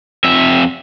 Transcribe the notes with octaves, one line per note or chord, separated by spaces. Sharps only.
F2 E5